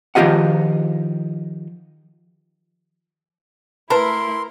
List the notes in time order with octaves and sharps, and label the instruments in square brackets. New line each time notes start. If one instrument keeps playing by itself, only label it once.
[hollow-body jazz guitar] D#3 F3 F4 G4 D#5 F#5
[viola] A3 E4 [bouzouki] A#4 [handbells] B4 A5 B5 [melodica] C6